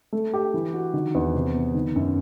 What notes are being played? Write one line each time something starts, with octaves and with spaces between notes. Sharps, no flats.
A3
G4
E3
F#4
D#3
E2
C3
B3
D#3
F#2